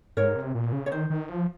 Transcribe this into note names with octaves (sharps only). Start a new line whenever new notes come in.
G#2 A#4 C#5
C3
A#2
C#3
C#5
D#3 C5
D#3
F3